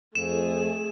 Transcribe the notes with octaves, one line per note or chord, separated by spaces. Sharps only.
F2 A3 G#4 E7